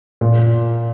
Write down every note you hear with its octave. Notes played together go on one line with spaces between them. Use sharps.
A#2